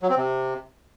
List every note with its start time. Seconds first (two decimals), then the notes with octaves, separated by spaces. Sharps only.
0.02 F#3
0.10 C4
0.17 C3